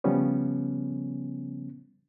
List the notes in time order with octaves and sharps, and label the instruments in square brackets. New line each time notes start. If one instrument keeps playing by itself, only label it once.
[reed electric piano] C#3 F3 G3 B3 C#4